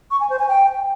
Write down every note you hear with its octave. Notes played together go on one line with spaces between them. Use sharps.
C#6
G#5
C5
G#5
G5